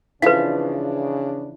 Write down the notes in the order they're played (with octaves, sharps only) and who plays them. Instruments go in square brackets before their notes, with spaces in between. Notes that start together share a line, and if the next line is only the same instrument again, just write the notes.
[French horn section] C#3 D4 [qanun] E3 F3 [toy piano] B4 F5